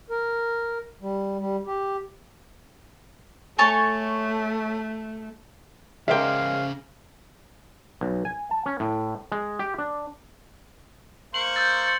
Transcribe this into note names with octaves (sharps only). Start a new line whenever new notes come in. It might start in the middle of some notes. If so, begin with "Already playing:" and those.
A#4
G3
G3
G4
A3 A4 C#5 G#5
C#3 G#3 A#4 C5 D5 E5 F5 G5
B1
G#5
A5
C#4
A2
G#3
G4
D4
A#3 C5 C#6 F#7
E6 G6 A6
A6 C#7